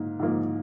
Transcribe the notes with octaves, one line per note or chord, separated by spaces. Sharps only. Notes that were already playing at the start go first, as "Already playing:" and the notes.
Already playing: G#2 A#3
G#2 F3 A#3